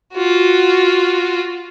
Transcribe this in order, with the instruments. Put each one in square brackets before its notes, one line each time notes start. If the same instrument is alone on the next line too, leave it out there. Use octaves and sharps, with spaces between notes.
[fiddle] F4 F#4